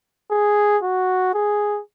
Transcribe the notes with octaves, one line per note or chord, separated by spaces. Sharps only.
G#4
F#4
G#4